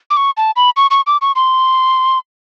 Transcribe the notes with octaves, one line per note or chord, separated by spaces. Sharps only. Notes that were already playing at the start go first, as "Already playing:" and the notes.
D6
C#6
A5
B5
C#6
C#6
D6
C#6
C6